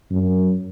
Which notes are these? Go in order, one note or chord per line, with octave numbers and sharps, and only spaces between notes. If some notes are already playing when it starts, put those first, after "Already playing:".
F#2